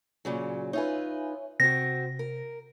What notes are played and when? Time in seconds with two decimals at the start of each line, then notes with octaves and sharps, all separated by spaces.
0.25 A#2 C#3 F#3
0.73 D#4 F4 B4 C#5 E5 G#5
1.60 C3 C4 F#4 A#6
2.19 A#4